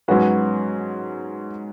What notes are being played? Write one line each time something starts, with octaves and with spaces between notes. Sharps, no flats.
G#2 F#3 C#4 F#4 B4